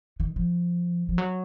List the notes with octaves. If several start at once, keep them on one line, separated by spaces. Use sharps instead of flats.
D#3
F3
F3
F#3